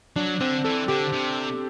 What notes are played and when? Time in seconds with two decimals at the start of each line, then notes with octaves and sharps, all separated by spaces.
0.16 F#3 D4
0.40 D3 C4
0.64 E3 A4
0.88 D3 G4
1.13 C3